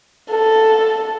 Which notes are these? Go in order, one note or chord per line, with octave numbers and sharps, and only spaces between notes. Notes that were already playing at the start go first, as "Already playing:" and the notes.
A4